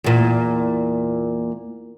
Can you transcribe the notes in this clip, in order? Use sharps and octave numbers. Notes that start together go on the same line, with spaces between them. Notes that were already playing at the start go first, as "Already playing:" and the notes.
E2 A#2